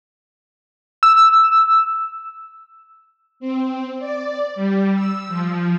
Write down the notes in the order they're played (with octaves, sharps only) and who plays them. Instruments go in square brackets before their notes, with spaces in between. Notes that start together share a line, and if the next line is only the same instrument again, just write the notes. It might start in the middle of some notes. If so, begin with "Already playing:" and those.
[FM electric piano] E6
[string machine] C4
D5
G3
E6
F3